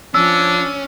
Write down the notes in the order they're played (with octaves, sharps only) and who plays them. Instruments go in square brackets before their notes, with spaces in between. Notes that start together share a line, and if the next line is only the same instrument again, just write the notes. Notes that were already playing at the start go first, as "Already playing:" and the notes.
[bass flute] F3 [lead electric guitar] C#4 [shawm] D4 [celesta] E6